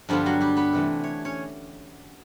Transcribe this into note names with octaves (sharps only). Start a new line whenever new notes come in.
G2 D3 F3 G3 B3 F4
F#3 F#4
G3 G4
B3 B4
C3 E3 A3
C#5
C#4 C#5